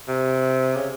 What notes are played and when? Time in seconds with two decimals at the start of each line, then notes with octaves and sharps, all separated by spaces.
0.08 C3
0.76 C#3